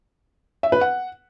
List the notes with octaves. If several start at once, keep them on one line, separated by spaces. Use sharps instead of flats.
E5
B4
F#5